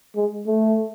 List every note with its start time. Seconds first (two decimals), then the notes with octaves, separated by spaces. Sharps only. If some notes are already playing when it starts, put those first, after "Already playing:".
0.16 G#3
0.47 A3